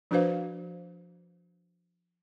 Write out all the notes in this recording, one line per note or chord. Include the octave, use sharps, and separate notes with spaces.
F3 D4 F#4 B4 C5 F5